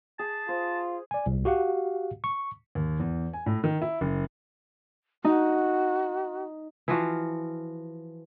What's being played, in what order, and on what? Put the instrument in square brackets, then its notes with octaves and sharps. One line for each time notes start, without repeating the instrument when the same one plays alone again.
[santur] G#4 [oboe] A5
[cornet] F4 [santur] C5
[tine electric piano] D5 G#5
C2
F#4 G4 F5 F#5
C#6
[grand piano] D#2
E2
G#5
A2
D#3
E4
F#1
[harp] D#4 [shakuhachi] F#4
[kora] E3 F3 F#4 F5